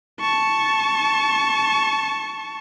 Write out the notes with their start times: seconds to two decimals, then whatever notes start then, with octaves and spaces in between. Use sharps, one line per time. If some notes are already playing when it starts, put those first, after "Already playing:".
0.21 A5 C#6